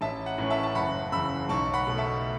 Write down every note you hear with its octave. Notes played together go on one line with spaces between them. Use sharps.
A1 E5 A5
F#5
A2 E3 C#4
E5 A5
A5
F#1 F#5 B5
E2 C#3 B5 E6
B1 A5 C#6
F#5 B5
B2 A3
E5 A5